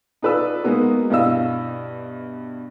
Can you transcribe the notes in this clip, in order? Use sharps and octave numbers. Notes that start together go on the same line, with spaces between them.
D#4 F4 B4 D5 E6
G#3 A#3 B3 D#4 F#4
G2 B2 E4 D#5 F5 E6